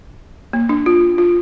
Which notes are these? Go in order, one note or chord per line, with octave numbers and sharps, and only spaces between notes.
A#3
D4
F4
F4